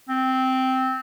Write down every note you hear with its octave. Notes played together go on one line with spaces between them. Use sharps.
C4